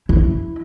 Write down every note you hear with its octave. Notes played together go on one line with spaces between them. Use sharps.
E4